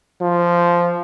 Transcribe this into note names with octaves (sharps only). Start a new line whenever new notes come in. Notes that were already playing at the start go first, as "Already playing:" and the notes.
F3